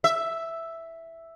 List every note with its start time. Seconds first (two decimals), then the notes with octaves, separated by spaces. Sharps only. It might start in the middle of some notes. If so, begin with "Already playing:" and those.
0.04 E5